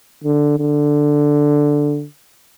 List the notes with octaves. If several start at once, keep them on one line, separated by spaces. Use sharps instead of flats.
D3
D3